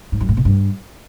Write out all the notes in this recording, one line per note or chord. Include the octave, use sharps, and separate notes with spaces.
G#2
F#2
A2
B2
G2